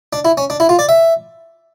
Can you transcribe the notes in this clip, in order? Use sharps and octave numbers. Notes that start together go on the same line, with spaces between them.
D4
E4
C#4
D4
E4
F4
D5
E5